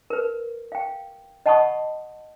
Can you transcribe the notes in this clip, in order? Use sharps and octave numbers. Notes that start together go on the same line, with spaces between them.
A#4 B4
F5 G5
D#5 F#5 A5 B5 C#6 D#6